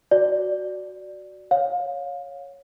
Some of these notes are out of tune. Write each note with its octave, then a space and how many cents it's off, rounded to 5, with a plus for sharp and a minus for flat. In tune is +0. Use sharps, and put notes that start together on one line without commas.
F#4 +0 D5 +0
C#5 +0 F5 +25